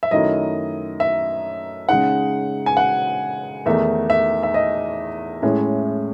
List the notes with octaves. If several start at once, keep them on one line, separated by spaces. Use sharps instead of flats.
E5
F#2 D#3 A3 E4 D#5
E5
C#3 G#3 D#4 F#5
G#5
F#5
E2 D#3 A3 D#4 E5
E5
E5
D#5
A2 G#3 C#4 E4